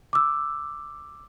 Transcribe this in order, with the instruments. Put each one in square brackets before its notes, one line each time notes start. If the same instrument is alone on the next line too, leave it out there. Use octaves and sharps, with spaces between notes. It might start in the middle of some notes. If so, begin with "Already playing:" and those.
[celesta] D6 E6